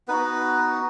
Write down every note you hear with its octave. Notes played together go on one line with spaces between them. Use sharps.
B3 D#4 F#4 B4